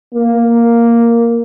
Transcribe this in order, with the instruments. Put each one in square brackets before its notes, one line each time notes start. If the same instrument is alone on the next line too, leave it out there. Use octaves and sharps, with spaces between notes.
[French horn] A#3